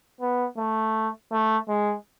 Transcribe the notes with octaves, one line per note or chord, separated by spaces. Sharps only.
B3
A3
A3
G#3